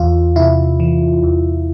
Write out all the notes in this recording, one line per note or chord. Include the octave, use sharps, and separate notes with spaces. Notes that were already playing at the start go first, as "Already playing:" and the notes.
Already playing: E2 F4
C3 E4
E3
E2